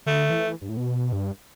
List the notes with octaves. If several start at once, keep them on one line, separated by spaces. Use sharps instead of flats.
D3 A3
E3
G2
A2
B2
G2